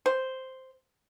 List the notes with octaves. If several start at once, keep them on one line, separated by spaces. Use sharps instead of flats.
C5